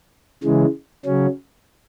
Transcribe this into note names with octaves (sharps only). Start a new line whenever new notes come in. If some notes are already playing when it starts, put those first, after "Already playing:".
C#3 E3 G#3
C#3 F#3 C#4